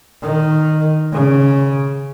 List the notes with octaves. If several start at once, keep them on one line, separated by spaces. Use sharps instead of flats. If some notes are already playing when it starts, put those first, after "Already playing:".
D#3
C#3